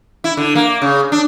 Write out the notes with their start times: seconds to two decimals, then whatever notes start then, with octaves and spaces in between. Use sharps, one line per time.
0.24 E4
0.37 D3
0.55 A#3
0.82 C#3
1.12 D4